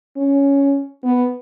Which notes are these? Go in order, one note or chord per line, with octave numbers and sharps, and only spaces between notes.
C#4
B3